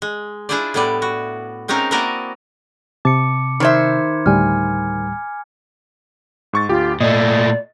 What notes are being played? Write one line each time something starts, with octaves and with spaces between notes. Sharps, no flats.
G#3
D4 E4 F4 G#4 C5 D5
A2 G3 B3 E4 D5
F#4
G#3 C4 C#4 D#4 A#4 F5
A#3 E4 F#4 A#4 D5 D#5
C3 A5 D6 C#7
D#3 C5 E5 B5 G#6
D2 A2 G3 G#5 F6
G#2 C#6 A6
D2 F4 G4
A#2 A3 D5 D#5